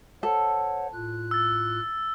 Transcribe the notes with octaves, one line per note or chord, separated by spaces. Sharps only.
A4 C5 C#5 F#5
A2 F4 F#6
E6 A6